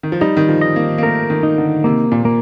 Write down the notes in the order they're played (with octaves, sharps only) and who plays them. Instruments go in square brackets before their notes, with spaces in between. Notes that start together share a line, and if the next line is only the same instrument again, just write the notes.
[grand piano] D#3
F3
[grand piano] G3 [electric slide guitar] D#4
[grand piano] D#3
F3
[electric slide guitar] D#5
[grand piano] A#3
A#3
[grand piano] A3 [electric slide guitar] A#4
[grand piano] D#3
[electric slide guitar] D#4
[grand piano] D3
[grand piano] C3 [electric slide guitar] A#3
[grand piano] A#2
[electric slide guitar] A#3